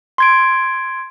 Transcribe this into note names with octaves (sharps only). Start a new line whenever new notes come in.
C6 G#6 D7